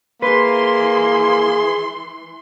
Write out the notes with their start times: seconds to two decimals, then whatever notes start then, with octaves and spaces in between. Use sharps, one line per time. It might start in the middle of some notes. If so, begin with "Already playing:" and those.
0.22 E3 A#3 G#4 B4 C6